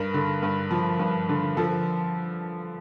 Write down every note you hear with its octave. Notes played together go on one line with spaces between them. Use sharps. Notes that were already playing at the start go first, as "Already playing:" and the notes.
Already playing: G2 A#4
D3
G2
F3
G2
D3
F3 A4